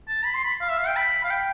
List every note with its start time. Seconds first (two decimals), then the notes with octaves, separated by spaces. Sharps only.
0.08 A5
0.25 B5
0.34 C6
0.44 B5
0.61 F5
0.69 E5
0.78 F5
0.87 G5
0.96 B5
1.24 F5
1.31 G5